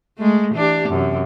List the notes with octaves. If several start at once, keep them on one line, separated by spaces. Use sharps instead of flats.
G#3 A3
E3 D4 G4
F#2 C3